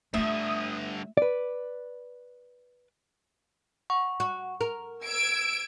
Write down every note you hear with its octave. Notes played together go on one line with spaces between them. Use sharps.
G2 D3 A3 F4 E5 D#6
B4 D5
F#5 C#6
F#4
A#4
E6 G#6 D7